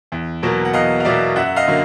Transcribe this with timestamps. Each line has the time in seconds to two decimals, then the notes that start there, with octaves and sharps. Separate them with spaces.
0.12 E2
0.43 B2 F#3 A#3
0.65 F#5
0.73 E2 D#5 F5
1.00 F5
1.05 B2 F#3 A#3 D5 E5
1.36 F#2 E5 F#5
1.56 D#5 F5
1.68 D3 F#3 A#3